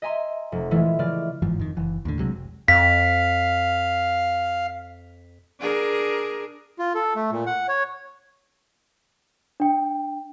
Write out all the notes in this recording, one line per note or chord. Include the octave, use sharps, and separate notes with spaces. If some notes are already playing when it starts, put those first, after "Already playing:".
D#5 E5 G#5 A#5 C6
F1
A#2 E3 G#3 A3 E4 F4
C#3 E3 D5 F6
G1 G#2 E3 F3
F2 D#3
F#1 E3
D#2 A2 D3
C2 C3 F#3 G#3
F1
F2 F5 B6
D4 G#4 A#4
F4
A4
A3
A#2
F#5
C#5
D4 G5